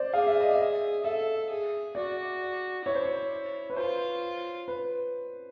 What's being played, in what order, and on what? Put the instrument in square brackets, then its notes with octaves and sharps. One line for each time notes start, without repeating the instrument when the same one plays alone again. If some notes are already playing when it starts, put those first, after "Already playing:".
Already playing: [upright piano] C5 D5
[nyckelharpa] G#4 [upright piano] F5
[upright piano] E5
D#5
E5
[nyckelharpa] A4 [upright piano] E5
[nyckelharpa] G#4
[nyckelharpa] F#4 [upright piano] D5
[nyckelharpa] E4 [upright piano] C#5
[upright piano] C5
C#5
B4
[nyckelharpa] F4 [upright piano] C5
[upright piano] B4